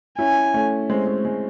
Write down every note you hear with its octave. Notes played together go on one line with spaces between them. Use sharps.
C#4 E4 G#5
A3 C#4
G#3 C4
G#3
G#3